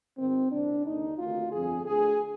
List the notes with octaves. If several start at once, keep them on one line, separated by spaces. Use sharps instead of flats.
G#1 G#2 D#3 C4
C2 A#2 D4
D#2 D3 D#4
D2 C3 D#3 F4
G1 F2 D3 G#4
D2 D3 G#4